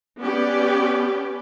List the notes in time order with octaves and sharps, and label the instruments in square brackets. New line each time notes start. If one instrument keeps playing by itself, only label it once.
[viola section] B3 C#4 G4 D5